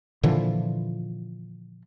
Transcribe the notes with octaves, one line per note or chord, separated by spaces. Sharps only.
A#2 D3 E3 F3